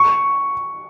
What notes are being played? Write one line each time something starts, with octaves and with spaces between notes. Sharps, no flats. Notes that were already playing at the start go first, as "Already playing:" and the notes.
Already playing: C#6